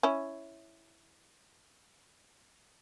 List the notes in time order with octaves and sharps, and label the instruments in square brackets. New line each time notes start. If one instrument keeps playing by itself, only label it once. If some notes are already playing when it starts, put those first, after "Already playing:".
[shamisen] C#4 E4